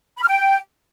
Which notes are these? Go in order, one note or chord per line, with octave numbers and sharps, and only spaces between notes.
B5
F6
G5